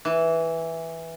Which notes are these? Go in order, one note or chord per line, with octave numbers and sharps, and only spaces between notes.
E3